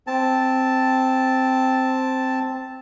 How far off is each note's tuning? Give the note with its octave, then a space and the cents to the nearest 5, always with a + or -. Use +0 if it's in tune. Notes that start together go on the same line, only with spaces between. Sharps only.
C4 +0 A5 +0